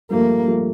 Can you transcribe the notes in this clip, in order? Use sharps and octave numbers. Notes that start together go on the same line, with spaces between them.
G2 F3 A3 A#3
G2 F3 A3